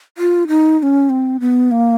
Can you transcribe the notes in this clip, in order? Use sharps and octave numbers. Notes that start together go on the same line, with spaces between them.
F4
D#4
D#4
C#4
C4
B3
A#3